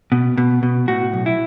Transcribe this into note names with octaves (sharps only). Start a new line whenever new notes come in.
B2
B2
B2
A2 F#4
B1
E4